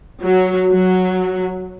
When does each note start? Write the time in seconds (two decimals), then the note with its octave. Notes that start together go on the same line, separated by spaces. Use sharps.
0.21 F#3
0.70 F#3